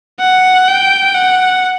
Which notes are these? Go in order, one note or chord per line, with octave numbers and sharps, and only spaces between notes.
F#5
G5
F#5